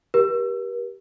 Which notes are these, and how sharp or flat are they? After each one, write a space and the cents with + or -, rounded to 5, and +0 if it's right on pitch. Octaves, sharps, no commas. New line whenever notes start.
G4 -5 A#4 +45